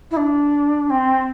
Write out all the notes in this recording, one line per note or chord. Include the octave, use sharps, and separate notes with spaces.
E4
D4
C4